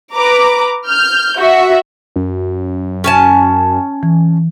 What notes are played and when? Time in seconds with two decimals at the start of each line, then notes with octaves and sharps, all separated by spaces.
0.14 B4 A#5 D6
0.89 F6 G6
1.39 F#4 E5
2.16 F#2
3.04 C#4 G#5 A5
4.03 E3